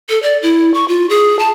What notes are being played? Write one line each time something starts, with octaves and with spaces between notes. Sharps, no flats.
A4
D5
E4
C#6
F4
G#4
A5